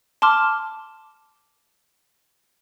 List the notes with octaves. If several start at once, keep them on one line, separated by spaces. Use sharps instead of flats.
A5 C6 D6 F6